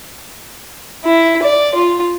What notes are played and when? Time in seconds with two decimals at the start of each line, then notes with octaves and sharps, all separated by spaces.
1.04 E4
1.43 D5
1.75 F4